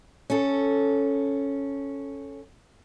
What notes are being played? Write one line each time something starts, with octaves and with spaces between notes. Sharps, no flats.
C#4 A4